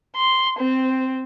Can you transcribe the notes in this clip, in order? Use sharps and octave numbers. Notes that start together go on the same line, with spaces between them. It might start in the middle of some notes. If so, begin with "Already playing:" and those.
C6
C4